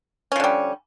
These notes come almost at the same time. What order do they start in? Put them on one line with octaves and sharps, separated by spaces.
C#4 F3 D3 G3